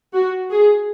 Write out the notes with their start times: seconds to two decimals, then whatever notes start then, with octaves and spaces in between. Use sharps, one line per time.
0.14 F#4
0.50 G#4